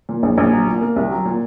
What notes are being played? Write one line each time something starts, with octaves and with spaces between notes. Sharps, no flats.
A#2
A#1
A#1
F#3
A#2
A#3
C2
F#3
A#2